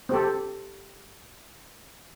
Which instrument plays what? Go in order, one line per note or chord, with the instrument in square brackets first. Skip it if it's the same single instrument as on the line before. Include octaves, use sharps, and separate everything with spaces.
[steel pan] C4 G4 A4